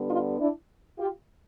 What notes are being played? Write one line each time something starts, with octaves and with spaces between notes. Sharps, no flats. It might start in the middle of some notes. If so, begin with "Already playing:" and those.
Already playing: D3 G3 B3
D#4 F4
D4 E4
F4 G4